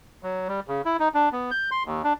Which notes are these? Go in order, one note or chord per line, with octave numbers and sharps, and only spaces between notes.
F#3
G3
C#3
E4
D#4
D4
B3
G6
C6
D#2
D4